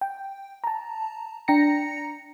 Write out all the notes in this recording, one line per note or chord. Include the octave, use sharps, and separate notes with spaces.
G5
A5 A#5
D4 G5 A#5 A#6 C#7